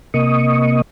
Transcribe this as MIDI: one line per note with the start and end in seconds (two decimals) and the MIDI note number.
0.14 0.82 48
0.14 0.82 58
0.14 0.82 75
0.14 0.82 85
0.14 0.82 87